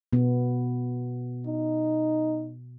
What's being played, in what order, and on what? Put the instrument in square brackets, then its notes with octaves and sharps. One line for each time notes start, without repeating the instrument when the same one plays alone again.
[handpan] B2 B3
[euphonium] D#4